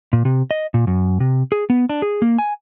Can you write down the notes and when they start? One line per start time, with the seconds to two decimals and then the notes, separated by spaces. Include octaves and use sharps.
0.13 A#2
0.25 C3
0.51 D#5
0.74 A#2
0.87 F#2
1.20 C3
1.52 G#4
1.70 B3
1.89 D4
2.02 G#4
2.22 A#3
2.39 G#5